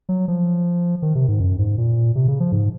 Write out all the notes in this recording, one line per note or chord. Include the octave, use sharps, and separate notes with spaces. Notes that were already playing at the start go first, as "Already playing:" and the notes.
F#3
F3
D#3
C3
G#2
F#2
G#2
A#2
C3
C#3
F3
G#2